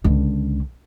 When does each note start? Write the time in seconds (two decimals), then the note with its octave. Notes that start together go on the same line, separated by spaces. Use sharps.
0.04 C#2 D3